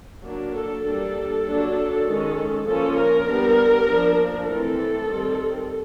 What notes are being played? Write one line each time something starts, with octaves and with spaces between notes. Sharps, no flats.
F#3 A#3 D4
A4
G3 A#3 D4 A4
F#3 A#3 D4
D#3 G#3 C#4
F3 A#3 C#4 A4
A#4
G3 B3 D4
F3 A#3 D4
E3 A3 C4 A4
D#3 G3 C4